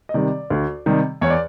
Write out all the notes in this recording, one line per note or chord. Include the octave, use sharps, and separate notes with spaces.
D#5
C3 D#3 G3 D5
D2
C3 D#3 G3
E2 C#5
D5